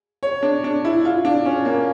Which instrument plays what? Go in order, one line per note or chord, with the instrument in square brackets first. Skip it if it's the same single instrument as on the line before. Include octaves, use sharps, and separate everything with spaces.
[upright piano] C#5
D4
D4
E4
F4
D4
C#4
A#3